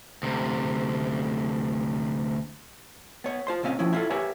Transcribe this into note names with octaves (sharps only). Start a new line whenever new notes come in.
D2 C3
B3 C#5
F4 C5 C6
C#2 A#2 C4 C#4 F5
F3 C#4 E4
E4 F4 A4
G4 A#4 B4 C#5 E5 G#5